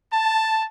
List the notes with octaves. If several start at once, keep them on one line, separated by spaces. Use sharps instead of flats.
A5